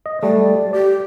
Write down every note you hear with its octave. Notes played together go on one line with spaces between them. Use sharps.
D#5
G3 A3 D5
G4 D5